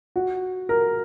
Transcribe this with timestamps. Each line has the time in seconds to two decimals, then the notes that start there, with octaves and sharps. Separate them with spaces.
0.16 F#4
0.69 A#4